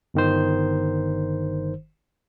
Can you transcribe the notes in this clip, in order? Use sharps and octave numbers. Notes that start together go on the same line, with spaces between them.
G1 D#3 C5